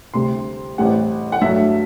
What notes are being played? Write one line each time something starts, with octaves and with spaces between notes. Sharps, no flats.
D2 C3 G3 C6
A1 A2 G3 C4 F#5
F#5
G2 F#3 A3 E5